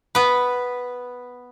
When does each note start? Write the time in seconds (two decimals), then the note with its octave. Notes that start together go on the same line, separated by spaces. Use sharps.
0.15 B3 B4